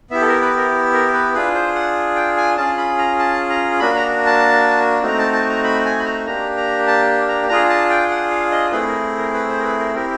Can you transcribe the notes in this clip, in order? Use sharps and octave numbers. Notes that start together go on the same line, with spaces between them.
B3 E4 G4 E5
A4
A#4
B4
A#4
A#4
B4
D4 F4 G#4 B4
C5
F#5
G5
G#5
C#4 F4 G#4 A5
B5
A#5
A5
A#5
A#3 D4 F#4 B5
A#5
A5
A3 C4 D#4 F#4 A#5
A5
A5
A#5
B5
G#5
B5
A#5
A#3 D4 G4 A#5
A#5
A5
A#5
D4 F4 G#4 A#5
A5
G5
F#5
F5
D#5
A3 C4 E4 G#4 B4
A#4
A#4
B4
C5
A#4
B4
A#4
C4 E4 G4 A#4